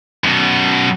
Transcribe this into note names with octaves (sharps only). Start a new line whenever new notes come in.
F#2 B2